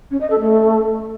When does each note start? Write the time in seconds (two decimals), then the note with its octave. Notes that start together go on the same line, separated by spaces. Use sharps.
0.11 C#4
0.21 D#5
0.30 A4
0.40 A3